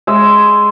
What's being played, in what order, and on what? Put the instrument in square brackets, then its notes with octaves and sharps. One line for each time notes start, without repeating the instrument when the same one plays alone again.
[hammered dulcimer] G#3 E5